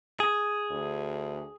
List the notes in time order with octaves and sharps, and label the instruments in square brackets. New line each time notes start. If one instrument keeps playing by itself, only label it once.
[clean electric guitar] G#4
[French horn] D2